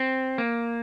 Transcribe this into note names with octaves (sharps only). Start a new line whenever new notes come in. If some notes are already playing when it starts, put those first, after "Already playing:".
Already playing: C4
A#3